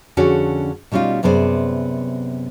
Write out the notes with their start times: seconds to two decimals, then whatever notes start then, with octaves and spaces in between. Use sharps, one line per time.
0.17 F2 D3 C#4 F#4 G#4 C#5
0.92 B2 G3 C#4 D#4 F4
1.23 F#2 C3 B3 G#4 C5 D5